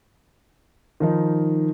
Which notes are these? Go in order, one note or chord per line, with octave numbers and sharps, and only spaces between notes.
D#3 F3 D#4